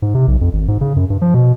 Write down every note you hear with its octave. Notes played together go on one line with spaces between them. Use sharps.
G#2
C3
B1
F2
G#1
G#2
C#3
F#2
G2
F3
B2